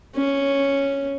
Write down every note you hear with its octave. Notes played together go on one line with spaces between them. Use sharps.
C#4